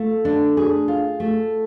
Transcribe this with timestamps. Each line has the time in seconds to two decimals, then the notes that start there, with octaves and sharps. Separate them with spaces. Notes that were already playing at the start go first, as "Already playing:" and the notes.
Already playing: A3 F4
0.25 D4
0.57 G#4
0.88 F4
1.20 A3